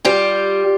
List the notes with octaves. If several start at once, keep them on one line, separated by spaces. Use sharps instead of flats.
G3 F4 G4